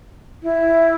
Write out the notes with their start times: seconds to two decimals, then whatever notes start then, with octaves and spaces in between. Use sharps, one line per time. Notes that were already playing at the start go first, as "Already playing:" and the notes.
0.43 E4